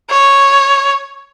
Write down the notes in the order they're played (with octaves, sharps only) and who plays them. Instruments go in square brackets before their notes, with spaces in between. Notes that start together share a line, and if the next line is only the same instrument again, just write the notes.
[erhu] C#5